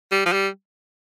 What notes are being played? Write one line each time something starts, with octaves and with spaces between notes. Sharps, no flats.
G3
F3
G3